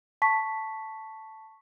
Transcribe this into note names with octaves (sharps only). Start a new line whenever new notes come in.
A5 C#6 B6